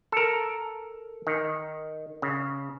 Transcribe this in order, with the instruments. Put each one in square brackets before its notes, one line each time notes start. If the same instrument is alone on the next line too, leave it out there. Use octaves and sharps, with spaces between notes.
[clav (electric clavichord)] A4 A#4
D#3
C#3